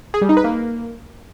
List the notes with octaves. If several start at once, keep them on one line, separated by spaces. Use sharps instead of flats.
G#4
G3
D#4
B4
A#3